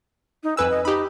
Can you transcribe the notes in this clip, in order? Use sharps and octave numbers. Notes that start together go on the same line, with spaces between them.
D#4
F2 B4 G#5 E6
D#5
D#4 G4 B5